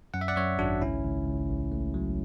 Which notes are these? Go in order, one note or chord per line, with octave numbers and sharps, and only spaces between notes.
F#2 F#5
E5
D5 F#5
F#2 C#5 E5
G#1 D4 F#4
C#2 C#4 E4
C#2
C#2
A1
A3
F#3